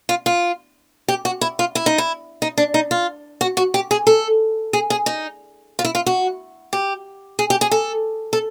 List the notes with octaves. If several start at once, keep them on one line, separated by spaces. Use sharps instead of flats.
F4
F4
G4
F#4
E4
F4
E4
D#4
E4
D#4
D4
D#4
F4
F#4
F#4
G4
G#4
A4
G#4
G#4
D#4
F4
E4
F4
F#4
G4
G#4
G4
G#4
A4
A4